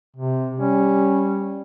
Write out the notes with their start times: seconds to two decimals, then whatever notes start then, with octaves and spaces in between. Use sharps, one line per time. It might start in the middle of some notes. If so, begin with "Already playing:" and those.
0.16 C3
0.60 G3 C#4